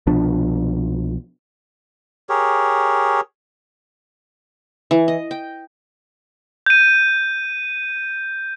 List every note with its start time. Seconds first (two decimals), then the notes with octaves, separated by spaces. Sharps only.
0.07 C2 B2 F3 D4
2.29 G4 G#4 A#4 C#5
4.91 E3
5.08 D#5
5.31 G5
6.66 G6 D#7